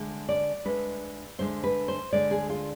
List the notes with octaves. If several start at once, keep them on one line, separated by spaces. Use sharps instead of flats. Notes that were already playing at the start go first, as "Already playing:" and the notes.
Already playing: D2 D3 G#3
D5
D2 D3 G#3 B4
D2 D3 G#3 C5
B4
C5
D2 D3 G#3 D5
G#4
F4